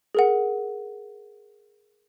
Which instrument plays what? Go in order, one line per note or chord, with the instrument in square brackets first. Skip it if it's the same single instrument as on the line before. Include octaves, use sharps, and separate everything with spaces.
[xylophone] G#4 A#4 F#5